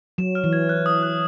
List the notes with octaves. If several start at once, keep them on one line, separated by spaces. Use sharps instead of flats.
F#3 E7
F6
E3
G#6
F#6
D#6
F#6